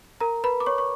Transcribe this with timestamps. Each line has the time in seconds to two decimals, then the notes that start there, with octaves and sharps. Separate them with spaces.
0.21 A#4 A#5
0.44 B4 B5
0.60 D6
0.66 C#5 C#6
0.78 C#6